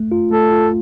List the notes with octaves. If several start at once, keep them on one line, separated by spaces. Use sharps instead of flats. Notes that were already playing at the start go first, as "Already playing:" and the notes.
Already playing: A3
F4
A3 A4
F4